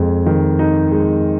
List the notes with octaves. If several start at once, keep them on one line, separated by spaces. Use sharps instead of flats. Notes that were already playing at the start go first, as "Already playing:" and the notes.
Already playing: F2 G#3
D#3
D#4
G#3